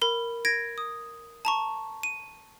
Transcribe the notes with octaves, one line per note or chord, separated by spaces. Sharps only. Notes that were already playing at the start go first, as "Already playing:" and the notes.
A#4 B5 G7
G#6 A#6 D7
D#6
A5 A#5 C#6
D#7